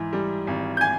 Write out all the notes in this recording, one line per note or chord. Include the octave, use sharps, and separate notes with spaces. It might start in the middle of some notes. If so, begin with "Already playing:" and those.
Already playing: G#2 E3
G3
G#1
G6
G#5 G#6